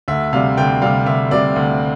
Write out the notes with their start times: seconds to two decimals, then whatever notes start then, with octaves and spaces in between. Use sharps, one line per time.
0.08 D2 E5
0.33 C3 G3 F5
0.57 D2 G5
0.82 C3 G3 F5
1.06 D2 E5
1.31 C3 G3 D5
1.56 D2